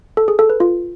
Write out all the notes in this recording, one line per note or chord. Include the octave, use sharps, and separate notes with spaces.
A4
G#4
A4
B4
F4